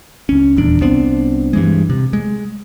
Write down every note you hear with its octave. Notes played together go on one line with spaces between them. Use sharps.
C#2 C#4
D#1 E2 D4
C2 B3 C4 D4
G2 E3 G#3
C3
G#3